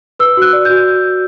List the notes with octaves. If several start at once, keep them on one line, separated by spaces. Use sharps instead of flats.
B4 E6
F#4 F#6
D5
G6
F#4